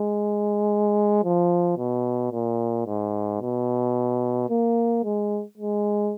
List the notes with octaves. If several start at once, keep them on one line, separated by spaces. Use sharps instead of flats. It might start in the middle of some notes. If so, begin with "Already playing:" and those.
Already playing: G#3
F3
B2
A#2
G#2
B2
A#3
G#3
G#3